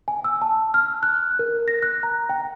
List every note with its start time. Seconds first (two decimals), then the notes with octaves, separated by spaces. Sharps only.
0.08 G#5
0.24 E6
0.42 A5
0.74 F6
1.03 F#6
1.39 A#4
1.68 A#6
1.83 F#6
2.03 A#5
2.29 G5